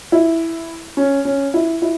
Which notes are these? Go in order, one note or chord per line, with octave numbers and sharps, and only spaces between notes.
E4
C#4
C#4
E4
E4